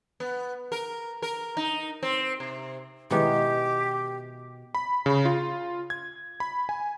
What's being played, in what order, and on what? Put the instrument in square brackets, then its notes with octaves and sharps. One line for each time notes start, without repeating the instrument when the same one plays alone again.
[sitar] B3
A#4
A#4
D#4
C4
C3
[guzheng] B2 D#3 [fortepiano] G#3 E4 B4 [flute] G4
[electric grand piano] B5
C#3
F4
G#6
B5
G#5